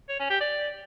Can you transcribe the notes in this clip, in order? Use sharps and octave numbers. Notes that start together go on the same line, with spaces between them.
C#5
C#4
G4
D5